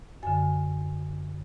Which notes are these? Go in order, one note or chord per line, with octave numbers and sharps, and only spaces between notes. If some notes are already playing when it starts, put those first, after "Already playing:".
F#2 D3 G#5